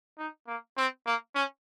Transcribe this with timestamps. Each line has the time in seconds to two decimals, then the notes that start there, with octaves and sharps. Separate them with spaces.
0.18 D#4
0.47 A#3
0.78 C4
1.06 A#3
1.35 C#4